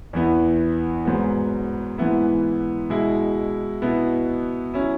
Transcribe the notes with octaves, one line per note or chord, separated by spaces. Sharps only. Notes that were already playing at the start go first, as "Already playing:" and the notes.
E2 E3 B3 E4
G#2 F#3 B3
G#2 E3 B3 E4
B2 G#3 E4
B2 B3 E4
F#3 C#4 E4